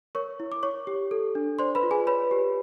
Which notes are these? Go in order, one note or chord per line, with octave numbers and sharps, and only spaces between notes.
A#4 C#5 C#6
E4
D6
C#5 C#6
G4
A4
D4
C5 D5 C6
B4 B5
F4
G#4 G#5
B4 C#5 B5
G4